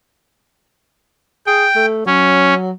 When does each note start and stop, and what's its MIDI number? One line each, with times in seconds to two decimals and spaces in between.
1.46 1.66 68
1.46 1.86 79
1.76 2.01 57
2.06 2.71 54
2.06 2.54 61